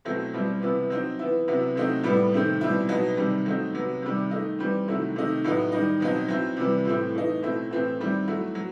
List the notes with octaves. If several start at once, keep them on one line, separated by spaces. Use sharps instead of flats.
B2 F#3 A3 C4 E4
B2 G3 C4 E4
C3 E3 B3 E4
F#3 C4 D#4
E3 B3 E4
C3 F#3 B3 E4
C3 F#3 A3 C4 D#4
A2 G3 B3 E4
C3 D#3 A3 C4
B2 G3 C4 E4
B2 F#3 B3 D#4
C3 D#3 G3
F#3 A3 C4 D#4
C3 F#3 B3
C3 D#3 G3
D#3 A3 D#4
E3 G3 C4
C3 D#3 F#3 A3 E4
C3 D#3 A3 D#4
A2 F#3 B3 D#4
D#3 G3 D#4
B2 F#3 C4 D#4
F#3 C4 E4
C3 E3 G3
A2 E3 A3 C4 E4
E3 A3 D#4
B2 A3 C4 E4
A2 E3 A3 C4 E4
D#3 G3 C4 E4
F#3 A3 E4
F#3